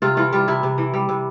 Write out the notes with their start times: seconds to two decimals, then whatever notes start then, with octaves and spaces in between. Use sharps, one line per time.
0.02 C3 F4
0.17 E3 F4
0.33 G3 F4
0.48 C3 E4
0.63 C3
0.78 E3
0.94 G3
1.09 C3